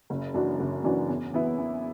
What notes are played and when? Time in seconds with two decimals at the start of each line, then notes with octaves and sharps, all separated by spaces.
0.10 F#1
0.34 F#2 E3 D4 F#4
0.60 F#1
0.84 F#2 E3 D4 F#4
1.09 E2
1.33 E3 B3 E4
1.58 E2